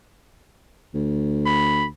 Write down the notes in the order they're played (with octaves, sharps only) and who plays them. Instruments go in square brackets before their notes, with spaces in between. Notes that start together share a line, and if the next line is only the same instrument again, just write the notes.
[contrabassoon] D2
[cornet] B5